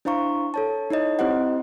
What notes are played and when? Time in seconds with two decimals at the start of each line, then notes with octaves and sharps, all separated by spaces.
0.05 D4 E4 C5 F5 A#5 C#6
0.54 A4 C#5 A5
0.90 D#4 E4 C#5 D#5
1.19 C4 E4 G4 C5 D#5 F#5